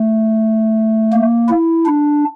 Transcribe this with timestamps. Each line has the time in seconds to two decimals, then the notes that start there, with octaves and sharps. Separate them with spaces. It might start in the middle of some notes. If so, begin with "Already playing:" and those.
Already playing: A3
1.13 A#3
1.49 E4
1.86 D4